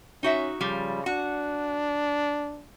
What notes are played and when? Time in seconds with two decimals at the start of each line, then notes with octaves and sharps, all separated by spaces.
0.23 C#4 D#4 F#4 E5
0.61 C#3 F3 G3
1.06 D4 F#4